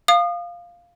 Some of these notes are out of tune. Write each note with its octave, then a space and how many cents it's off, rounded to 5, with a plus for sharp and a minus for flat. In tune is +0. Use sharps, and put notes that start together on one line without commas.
F5 +0 D#6 -35